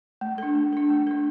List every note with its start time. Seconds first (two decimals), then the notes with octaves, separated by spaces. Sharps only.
0.21 A3
0.38 D4 A4
0.55 A3
0.73 D4 A4
0.90 A3
1.07 D4 A4